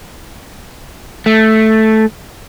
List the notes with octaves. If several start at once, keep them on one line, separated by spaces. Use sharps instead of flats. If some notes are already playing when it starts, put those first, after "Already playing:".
A3